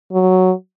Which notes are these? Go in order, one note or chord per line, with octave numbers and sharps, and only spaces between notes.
F#3